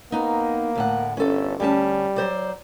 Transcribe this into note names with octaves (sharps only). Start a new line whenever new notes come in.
A#3 B3 D#4
D2 A2 F#5
G1 C#4 A4
D2 G3 C#4 A5
F#3 C5 D5